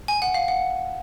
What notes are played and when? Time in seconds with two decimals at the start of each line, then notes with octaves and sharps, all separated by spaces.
0.08 G#5
0.22 F#5
0.34 F5
0.48 F#5